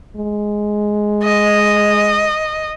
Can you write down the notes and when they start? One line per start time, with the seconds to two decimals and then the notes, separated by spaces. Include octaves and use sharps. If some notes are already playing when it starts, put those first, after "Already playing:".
0.16 G#3
1.23 D#5